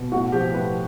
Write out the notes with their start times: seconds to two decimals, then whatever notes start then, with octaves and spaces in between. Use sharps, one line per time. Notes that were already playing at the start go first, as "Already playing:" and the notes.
Already playing: B2
0.12 A2 F#4
0.32 F3 G4
0.54 A2 B4